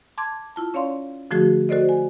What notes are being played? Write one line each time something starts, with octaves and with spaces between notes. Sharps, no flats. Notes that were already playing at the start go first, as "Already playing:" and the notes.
A5 C6 D6 G#6
E4 F4 A5
C#4 C#5 D5 F5 C6
D3 F3 A3 F#4 G#4
F#4 A4 C5 D5 D#5
G#5